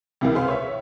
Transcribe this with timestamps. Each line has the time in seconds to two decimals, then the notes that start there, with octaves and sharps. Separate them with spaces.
0.21 C#2 C3 E3 A#3
0.35 G#4 B4 C5 F5
0.48 C#5 E5